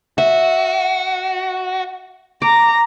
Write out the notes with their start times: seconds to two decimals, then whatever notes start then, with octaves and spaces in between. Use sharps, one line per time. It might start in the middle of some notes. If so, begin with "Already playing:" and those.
0.18 F#4 E5
2.42 A#5 D6